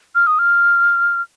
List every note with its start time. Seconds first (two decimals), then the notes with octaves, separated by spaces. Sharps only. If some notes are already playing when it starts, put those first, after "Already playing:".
0.15 F6
0.27 D#6
0.39 F6